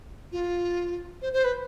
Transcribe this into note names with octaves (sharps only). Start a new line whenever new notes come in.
F4
C5
C5
B4